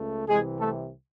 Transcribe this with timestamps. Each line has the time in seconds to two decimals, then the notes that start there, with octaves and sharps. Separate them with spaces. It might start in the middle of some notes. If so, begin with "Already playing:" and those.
Already playing: C#2 A3
0.28 C2 C3 E3 G#3 G#4
0.59 A3 A4